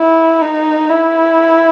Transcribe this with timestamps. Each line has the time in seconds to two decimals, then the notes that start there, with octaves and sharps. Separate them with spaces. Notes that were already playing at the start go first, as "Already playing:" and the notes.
Already playing: E4
0.41 D#4
0.90 E4